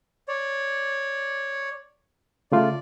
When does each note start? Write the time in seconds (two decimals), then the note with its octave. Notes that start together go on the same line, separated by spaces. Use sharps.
0.28 C#5 D5
2.52 C#3 A3 F4 D5